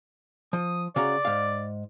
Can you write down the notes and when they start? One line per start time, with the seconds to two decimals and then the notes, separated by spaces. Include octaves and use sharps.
0.53 F3 D#6
0.96 C#3 F#4 D5 A#5
1.25 G#2 F5